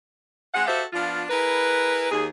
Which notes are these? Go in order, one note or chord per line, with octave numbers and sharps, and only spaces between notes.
G#3 C4 G#4 F#5
F#4 G4 A4 C5 E5 F5
F3 B3 D4 F4
E4 G#4 A#4 B4
D#2 G#4